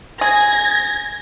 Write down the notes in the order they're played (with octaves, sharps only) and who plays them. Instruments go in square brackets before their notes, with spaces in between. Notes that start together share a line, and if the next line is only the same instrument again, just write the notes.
[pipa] G#4 [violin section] G#6 A#6